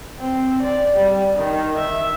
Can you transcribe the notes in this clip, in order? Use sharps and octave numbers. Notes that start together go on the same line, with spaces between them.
C4
D5
G3
D#3
E5